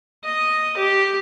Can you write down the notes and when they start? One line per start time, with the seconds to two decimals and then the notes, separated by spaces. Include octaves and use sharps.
0.24 D#5
0.77 G4